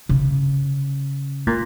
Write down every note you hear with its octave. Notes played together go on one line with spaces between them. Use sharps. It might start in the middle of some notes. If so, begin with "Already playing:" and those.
C#3
A#2